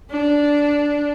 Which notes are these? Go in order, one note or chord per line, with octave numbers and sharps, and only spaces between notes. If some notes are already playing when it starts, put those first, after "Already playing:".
D4